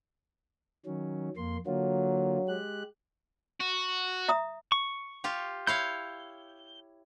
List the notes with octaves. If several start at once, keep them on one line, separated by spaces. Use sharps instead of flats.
D#3 F#3 C#4
F2 A#3 C6
D3 F#3 A#3 F4
G#3 G4 F#6
F#4
E5 A#5 D#6
C#6
F4 G4
E4 C#5 F5 G6